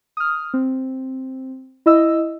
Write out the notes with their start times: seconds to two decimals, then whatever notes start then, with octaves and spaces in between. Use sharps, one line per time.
0.17 D#6 F6
0.54 C4
1.86 E4 D#5 E6